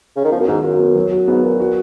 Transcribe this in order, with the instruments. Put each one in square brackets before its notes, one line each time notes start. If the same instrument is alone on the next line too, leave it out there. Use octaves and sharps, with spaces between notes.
[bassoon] C#3
D#3
[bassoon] F3 [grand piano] B3
[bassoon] F#2
[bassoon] G#2 [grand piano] D#3
[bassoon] F#2 [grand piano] F4
[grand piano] B3
F#3
F#4
[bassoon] G#2 [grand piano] B3
[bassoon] A#2 [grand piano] F#4
[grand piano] F#4